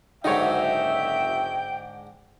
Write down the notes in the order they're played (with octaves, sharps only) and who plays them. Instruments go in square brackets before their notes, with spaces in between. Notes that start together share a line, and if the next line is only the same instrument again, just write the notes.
[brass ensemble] F#1 E5 [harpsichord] G#2 D3 [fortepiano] D#4 C#5 [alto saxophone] G5